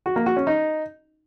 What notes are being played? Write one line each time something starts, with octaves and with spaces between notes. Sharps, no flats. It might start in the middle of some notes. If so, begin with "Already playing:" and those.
F#4
A#3
F#4
C#4
D#4